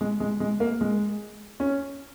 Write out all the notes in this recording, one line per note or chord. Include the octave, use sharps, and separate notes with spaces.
G#3
G#3
G#3
A#3
G#3
C#4